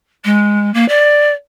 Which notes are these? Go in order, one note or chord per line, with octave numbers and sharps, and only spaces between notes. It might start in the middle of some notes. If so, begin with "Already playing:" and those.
G#3
A#3
D5